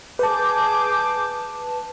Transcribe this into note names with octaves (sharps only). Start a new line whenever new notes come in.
G#4 B4 A5 D6 G6